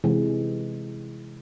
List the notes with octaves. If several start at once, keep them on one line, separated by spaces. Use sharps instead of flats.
C3 E3 G#3